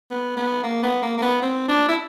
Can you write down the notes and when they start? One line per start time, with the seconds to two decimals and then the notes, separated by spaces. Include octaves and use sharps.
0.11 B3
0.37 B3
0.63 A#3
0.82 B3
1.02 A#3
1.18 A#3
1.22 B3
1.42 C4
1.68 D4
1.89 E4